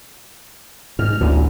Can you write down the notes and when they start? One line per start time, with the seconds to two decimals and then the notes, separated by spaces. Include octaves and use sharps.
0.99 G#2 F6
1.21 A1 D2 A#2 D3